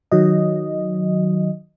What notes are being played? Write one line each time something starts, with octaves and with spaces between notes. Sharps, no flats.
D#3 F#3 D#5